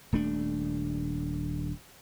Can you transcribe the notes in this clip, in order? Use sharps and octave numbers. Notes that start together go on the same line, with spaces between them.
D#1 A3 D4